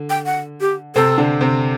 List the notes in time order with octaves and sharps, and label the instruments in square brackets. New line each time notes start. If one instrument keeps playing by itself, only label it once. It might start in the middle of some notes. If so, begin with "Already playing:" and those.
Already playing: [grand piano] D3
[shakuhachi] G5
F#5
G4
[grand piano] C3 C4 [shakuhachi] A4
[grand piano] D3 D4
C3 C4